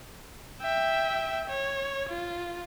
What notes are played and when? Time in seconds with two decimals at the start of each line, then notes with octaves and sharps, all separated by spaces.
0.62 E5 G5
1.50 C#5
2.09 F4